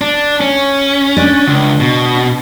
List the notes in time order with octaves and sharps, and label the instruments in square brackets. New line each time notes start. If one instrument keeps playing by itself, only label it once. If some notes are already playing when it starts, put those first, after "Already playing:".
[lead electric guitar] D4
C#4
[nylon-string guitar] D4
[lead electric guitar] C#2
B2